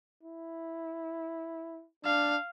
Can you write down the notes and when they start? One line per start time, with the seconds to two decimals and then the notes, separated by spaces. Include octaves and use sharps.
0.23 E4
2.05 D4 F5